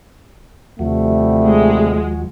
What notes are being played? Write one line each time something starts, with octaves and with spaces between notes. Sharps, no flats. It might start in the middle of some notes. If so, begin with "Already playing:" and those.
D#2 C3 F3 G3 A3 F#4
G#3